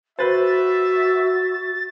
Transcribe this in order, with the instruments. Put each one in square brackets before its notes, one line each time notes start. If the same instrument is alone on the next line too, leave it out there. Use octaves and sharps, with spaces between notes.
[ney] F#4 [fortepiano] B4 C5 [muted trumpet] E5 [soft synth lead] A6